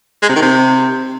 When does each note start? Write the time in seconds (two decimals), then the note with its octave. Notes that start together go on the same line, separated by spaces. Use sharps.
0.22 G#3
0.29 C3
0.35 D#3
0.42 C3